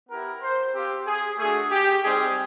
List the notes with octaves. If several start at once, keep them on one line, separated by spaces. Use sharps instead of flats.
B3 E4 G4 A#4
C5
C4 F4 G4
G#4
A3 D4 F#4 G#4
G4
G3 C4 D#4 G#4